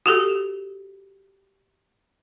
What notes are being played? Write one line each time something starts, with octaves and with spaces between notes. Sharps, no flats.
F#4 G4 A4